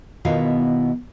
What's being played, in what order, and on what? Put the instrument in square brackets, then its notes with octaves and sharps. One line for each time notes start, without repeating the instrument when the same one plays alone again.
[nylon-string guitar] B2 D#3 B3 E4 F4 F5